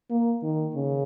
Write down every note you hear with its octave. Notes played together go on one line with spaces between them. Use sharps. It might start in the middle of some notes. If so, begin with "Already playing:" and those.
A#3
D#3
C#3